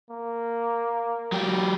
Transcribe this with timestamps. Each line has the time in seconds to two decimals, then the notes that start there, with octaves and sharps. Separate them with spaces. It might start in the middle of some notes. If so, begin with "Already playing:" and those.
0.10 A#3
1.32 F#3 G4